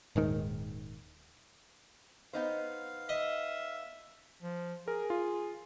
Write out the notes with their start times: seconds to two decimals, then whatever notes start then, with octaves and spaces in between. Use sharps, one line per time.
0.16 D#1 G#2 D#3
2.33 B3 D#4 C5 F5
3.09 D#5 E5
4.43 F3
4.88 G#4 A#4
5.10 F4